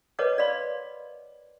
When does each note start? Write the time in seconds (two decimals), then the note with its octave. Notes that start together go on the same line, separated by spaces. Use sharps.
0.19 A#4 B4 C#5 D#5 F#5 D6
0.38 D5 F5 B5 C6